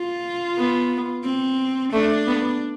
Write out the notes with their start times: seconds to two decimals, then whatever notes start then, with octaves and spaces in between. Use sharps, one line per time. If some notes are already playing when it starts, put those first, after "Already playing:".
Already playing: F4
0.58 B3
1.24 C4
1.93 A3 D4
2.27 B3